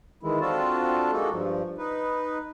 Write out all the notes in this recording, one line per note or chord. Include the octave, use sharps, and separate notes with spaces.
D#3 E3 G#3 E4
C4 D4 F4 F#4 A4 A5
G#3 A#3 D#4 F#4 A4
G2 F3
D#4 B4